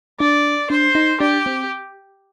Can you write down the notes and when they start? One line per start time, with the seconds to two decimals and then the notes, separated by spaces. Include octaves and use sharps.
0.20 D4 D5
0.70 D4 C5
0.95 D#4
1.20 D4 G4
1.46 C4